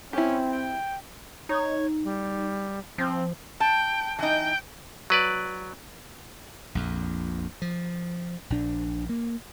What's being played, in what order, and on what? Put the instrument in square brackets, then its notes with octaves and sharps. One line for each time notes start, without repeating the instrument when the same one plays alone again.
[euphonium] C4 [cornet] C#4 [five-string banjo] E4 G4
[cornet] G5
[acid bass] D#4 [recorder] C#5
[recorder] G3
[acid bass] F3 [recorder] C4
[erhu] G5 [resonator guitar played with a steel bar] A5
[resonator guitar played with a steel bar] E3 D#4 [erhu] G5
[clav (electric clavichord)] F#3 B4 D5
[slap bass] A#1 F2
F3
A#1 D4
A#3